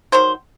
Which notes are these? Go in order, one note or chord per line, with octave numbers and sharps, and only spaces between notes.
D#3 F#3 C5